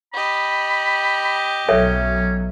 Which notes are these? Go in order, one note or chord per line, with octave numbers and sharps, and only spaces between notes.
G4 D#5 B5
B1 F#3 C#4 A4 C#5 E5